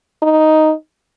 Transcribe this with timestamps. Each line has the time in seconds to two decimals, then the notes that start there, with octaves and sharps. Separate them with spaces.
0.22 D#4